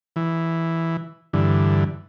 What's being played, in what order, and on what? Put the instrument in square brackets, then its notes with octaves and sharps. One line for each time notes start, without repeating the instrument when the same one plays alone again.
[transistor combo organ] E3
G2 D3 E3